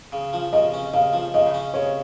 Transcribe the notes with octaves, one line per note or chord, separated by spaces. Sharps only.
C#3
F3
C#3 D#5
C#4
C#3 F5
F3
C#3 D#5
C#4
C#3 C#5